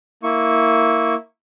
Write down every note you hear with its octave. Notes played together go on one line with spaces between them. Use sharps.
A#3 E4 C#6